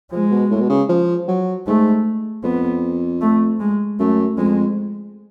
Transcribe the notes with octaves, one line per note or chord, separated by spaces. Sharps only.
F3 G#3
B2
A2
B2
C#3
F3
F#3
G#2 A3
F2 B3
A3
G#3
F#2 A3
F2 G#3